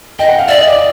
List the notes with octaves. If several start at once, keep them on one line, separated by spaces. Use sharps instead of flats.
D#5 G5
F#5
F5
D5 E5
D#5
D5